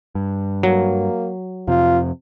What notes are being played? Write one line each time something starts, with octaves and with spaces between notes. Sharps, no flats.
G2
F#3 A#3
F2 C3 F4